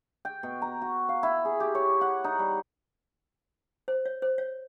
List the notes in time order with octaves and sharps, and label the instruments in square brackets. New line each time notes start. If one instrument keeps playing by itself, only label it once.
[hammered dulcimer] G5
B2
A#5
F#4
F5
E4
G#4
G4
C#5
F#5
D#4
G3
[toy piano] C5
C#5
C5
C#5